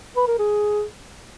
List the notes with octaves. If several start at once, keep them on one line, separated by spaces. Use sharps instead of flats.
B4
A#4
G#4